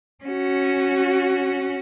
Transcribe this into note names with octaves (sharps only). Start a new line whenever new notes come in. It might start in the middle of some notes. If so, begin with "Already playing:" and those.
C#4 F#4